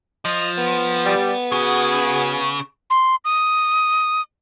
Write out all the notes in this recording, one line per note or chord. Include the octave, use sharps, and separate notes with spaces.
F3 D#5
B3
G3
C#3 F#4 G#4
C6
D#6